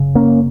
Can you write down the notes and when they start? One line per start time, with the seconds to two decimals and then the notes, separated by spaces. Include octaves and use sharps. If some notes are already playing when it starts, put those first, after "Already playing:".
Already playing: F#1 C#3
0.15 A#3 C#4